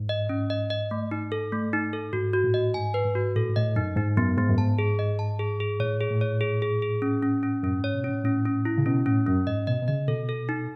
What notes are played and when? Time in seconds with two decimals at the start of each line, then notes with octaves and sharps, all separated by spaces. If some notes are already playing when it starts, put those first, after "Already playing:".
Already playing: G#2
0.09 D#5
0.29 G#2 C#4
0.50 D#5
0.70 D#5
0.91 A3
1.11 D#4
1.32 A4
1.52 A3
1.73 D#4
1.93 A4
2.13 G#2 F#4
2.33 F#4
2.44 A2
2.54 D#5
2.74 G#2 G#5
2.94 B4
3.05 G#2
3.15 F#4
3.36 A2 A4
3.49 G#2
3.56 A2 D#5
3.76 F#2 D#4
3.96 G#2 D#4
4.17 F#2 B3
4.37 G#2 B3
4.49 F#2
4.57 G#2 A5
4.79 G#4
4.99 D#5
5.19 A5
5.39 G#4
5.60 G#4
5.80 A2 C#5
6.01 G#4
6.11 A2
6.21 C#5
6.41 G#4
6.62 G#4
6.82 G#4
7.02 C#4
7.23 C#4
7.43 C#4
7.63 F#2 C#4
7.78 G#2
7.84 C#5
7.94 B2
8.04 A2 C#4
8.24 A2 C#4
8.45 C#4
8.65 E4
8.78 C#3
8.86 B2 C#4
9.06 A2 C#4
9.27 F#2 C#4
9.47 G#2 D#5
9.67 B2 D#5
9.82 B2
9.88 C#3 D#5
10.08 B2 A4
10.29 A4
10.49 D#4